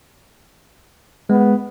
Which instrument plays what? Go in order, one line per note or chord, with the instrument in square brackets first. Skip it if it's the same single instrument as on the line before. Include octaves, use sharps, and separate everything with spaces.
[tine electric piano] G#3 [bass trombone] B3